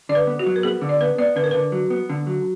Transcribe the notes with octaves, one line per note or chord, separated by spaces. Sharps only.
D3 D5
B4
B3
F#4
F#3
A#4
B3 G#4
D3
D5
B3 B4
B3 D5
D3 B4
A#4
D3 B4
F#3
B3
D3
F#3